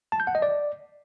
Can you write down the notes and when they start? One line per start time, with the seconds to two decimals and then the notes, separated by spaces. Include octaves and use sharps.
0.12 A5
0.20 G6
0.27 F#5
0.35 D#5
0.42 D5